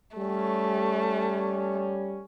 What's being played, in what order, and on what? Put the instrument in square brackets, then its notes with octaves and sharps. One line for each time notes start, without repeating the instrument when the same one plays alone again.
[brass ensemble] G3 C#4 [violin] A3